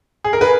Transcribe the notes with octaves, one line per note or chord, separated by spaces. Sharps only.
G#4
A#4
B4